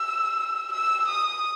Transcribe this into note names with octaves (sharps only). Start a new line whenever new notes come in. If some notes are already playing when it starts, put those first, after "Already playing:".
Already playing: E6
E6
D#6